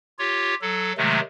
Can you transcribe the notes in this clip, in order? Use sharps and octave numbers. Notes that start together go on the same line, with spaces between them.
F4 G4 C#5
F#3 A4
C3 D#3 F#3 G#3 A3